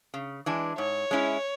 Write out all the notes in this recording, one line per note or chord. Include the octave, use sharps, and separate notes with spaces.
C#3
E3 G#3 D4
G#2 C#5
G#3 C#4 E4